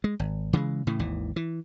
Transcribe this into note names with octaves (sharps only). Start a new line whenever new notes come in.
G#3
G#1
C#3 E3 F#3 G#3
A2 C#3 E3
G#1 D#2 E3
E3